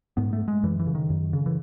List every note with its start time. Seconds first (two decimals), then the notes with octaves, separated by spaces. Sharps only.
0.17 G#2 B3
0.33 A3
0.48 G#3
0.63 F#2 E3
0.79 E3
0.86 C#3
0.95 D#3
1.10 F#2
1.33 C#3
1.46 E3